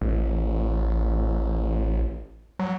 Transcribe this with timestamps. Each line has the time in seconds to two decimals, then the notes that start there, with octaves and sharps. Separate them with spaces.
0.01 A1
2.59 F#3